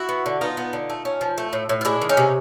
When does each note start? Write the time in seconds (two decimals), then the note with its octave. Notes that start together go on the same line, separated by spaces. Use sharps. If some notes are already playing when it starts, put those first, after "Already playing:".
Already playing: E4 F#4
0.09 B3
0.26 D3
0.41 B3 D#4 F4
0.57 B3
0.73 D3
0.90 A3
1.05 C#4
1.21 F3
1.38 A3
1.53 A2
1.69 A2
1.81 F4
1.85 G#3 D4 E4
2.02 D#3
2.09 C#4 D#4
2.17 C3